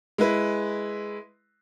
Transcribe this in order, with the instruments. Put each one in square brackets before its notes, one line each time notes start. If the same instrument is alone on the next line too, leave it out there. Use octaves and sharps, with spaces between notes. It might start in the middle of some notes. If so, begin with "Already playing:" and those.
[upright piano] G#3 E4 B4